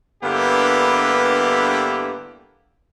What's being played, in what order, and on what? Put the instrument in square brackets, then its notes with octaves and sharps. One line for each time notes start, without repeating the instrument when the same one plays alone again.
[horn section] G2 D3 A#3 B3 E4 G4